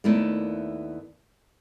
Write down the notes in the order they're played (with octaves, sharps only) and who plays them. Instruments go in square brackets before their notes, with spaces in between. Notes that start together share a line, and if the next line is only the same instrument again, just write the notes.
[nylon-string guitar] D#2 A3 B3 E4 A#4 D5